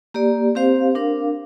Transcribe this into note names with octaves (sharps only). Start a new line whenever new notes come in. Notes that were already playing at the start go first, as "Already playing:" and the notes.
A#3 G4 D5
C4 G4 C5 F5
D4 A#4 F5